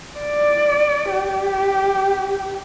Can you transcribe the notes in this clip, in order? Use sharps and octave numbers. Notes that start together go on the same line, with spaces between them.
D5
G4